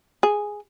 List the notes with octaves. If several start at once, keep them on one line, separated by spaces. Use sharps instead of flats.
G#4